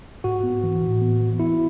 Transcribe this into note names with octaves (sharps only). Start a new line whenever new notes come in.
G#2 F#4
B3
E3
A2
B3
E3
B3 E4